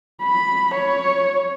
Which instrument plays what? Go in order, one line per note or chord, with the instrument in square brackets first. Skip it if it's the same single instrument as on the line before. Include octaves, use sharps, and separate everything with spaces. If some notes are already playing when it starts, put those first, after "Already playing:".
[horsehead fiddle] B5
C#5